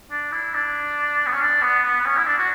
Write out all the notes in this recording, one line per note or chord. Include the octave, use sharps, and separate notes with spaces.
D4
E4
D4
B3
C#4
D4
B3
B3
B3
C#4
E4
D4
F#4